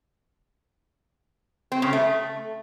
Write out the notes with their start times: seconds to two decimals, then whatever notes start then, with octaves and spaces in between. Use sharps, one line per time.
1.72 C4
1.82 C#3
1.93 A3